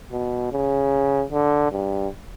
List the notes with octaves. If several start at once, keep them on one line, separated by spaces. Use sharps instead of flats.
B2
C#3
D3
G2